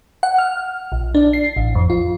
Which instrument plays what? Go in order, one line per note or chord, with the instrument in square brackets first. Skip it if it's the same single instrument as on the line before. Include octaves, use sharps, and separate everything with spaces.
[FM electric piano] F#5
F6
A#1
D4
C7
A1
F2
F4